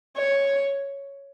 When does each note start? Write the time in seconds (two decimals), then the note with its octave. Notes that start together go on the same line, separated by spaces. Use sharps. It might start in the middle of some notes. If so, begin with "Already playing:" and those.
0.16 C#5